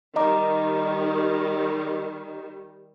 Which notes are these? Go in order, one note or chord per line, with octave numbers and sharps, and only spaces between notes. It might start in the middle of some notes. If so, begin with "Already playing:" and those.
D#3 G3 D#5 A#5 D6